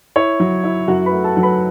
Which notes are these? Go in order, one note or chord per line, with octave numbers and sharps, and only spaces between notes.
E4 C#5
F#3
E4
F#2 F#4 F#5
B4 B5
A3
A4 A5
F#3
B4 B5